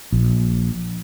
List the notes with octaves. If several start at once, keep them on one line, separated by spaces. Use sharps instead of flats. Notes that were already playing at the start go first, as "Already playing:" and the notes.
A#1